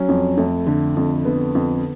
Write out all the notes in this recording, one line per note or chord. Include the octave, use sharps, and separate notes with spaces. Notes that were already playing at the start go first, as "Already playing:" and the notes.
Already playing: F#3 C#4
F2
F2 A3
D3
F2
D3 B3
F2